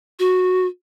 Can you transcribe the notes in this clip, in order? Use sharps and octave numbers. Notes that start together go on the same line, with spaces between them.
F#4